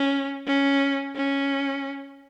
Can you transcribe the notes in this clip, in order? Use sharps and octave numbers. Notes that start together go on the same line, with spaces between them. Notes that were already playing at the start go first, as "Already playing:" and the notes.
Already playing: C#4
C#4
C#4